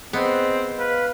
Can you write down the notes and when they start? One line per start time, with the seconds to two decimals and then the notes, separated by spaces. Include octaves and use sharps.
0.13 B3 C4 G#4 C5 D#5
0.79 B4 F5